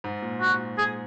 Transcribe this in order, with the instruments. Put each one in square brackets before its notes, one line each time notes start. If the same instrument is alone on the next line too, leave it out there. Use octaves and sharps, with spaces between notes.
[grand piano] G#2
A#2
[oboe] F#4
G#4